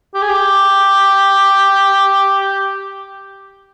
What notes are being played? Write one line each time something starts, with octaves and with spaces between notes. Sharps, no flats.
G4
G#4
G4